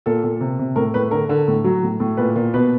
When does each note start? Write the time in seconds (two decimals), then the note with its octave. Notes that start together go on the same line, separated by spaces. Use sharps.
0.06 A#2 A4
0.23 A#2
0.41 C3
0.59 C3
0.76 A2 A#4
0.94 A2 B4
1.11 D3 A#4
1.29 D3
1.48 A2
1.64 F#3
1.83 A2
2.00 A2
2.17 A#2 B4
2.35 A#2
2.54 B2 B4